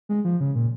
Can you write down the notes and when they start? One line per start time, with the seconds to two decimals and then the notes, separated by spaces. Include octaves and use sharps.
0.09 G#3
0.25 F3
0.40 C#3
0.55 A#2